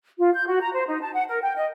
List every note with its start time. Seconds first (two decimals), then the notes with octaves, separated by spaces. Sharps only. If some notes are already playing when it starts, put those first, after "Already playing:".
0.17 F4
0.33 G6
0.47 F#4
0.62 A#5
0.73 C5
0.88 D#4
1.02 A5
1.13 F#5
1.29 A#4
1.43 G5
1.56 D#5